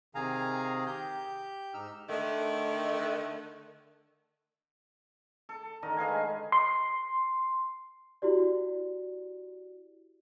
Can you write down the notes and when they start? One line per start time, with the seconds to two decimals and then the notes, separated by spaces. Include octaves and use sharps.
0.15 C3 D#3 G#4 F5 G#5 A#5
0.86 G4 G6
1.74 G#2 D#4 E6 F6
2.09 D3 D#3 A3
5.49 A4
5.82 D3 D#3 A#4 D#5
5.97 G#4 B4 F5 G#5
6.08 G#3
6.52 C6
8.22 E4 F#4 G4 D5